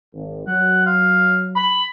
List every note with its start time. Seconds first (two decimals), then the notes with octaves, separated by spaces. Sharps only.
0.14 G#1
0.47 F#3 F#5
0.86 F5
1.56 B5